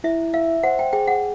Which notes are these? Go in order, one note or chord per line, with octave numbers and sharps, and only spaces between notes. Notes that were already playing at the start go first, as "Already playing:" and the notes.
E4 E5
E5 F5
C5 F#5
G5
G#4 G5
F#5